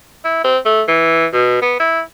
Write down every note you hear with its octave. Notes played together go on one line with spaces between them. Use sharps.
E4
C4
A3
E3
B2
B3
E4